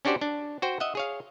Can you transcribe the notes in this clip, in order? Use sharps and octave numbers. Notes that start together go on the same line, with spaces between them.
C#4 D4 F#4 G4 C5 D5
D4
F#4 C5 G5
D#5 E5 F#5
G#4 C#5 F5